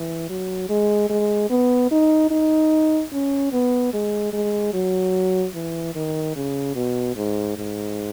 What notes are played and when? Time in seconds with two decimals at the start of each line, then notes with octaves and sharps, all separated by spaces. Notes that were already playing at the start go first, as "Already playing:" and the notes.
Already playing: E3
0.29 F#3
0.69 G#3
1.09 G#3
1.50 B3
1.91 D#4
2.31 D#4
3.12 C#4
3.52 B3
3.93 G#3
4.33 G#3
4.74 F#3
5.54 E3
5.95 D#3
6.36 C#3
6.75 B2
7.16 G#2
7.57 G#2